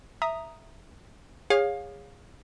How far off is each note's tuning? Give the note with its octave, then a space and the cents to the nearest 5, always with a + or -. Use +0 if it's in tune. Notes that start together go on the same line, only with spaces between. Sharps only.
E5 +0 A#5 +0 D#6 +0
G#4 -25 C#5 +0 F5 +20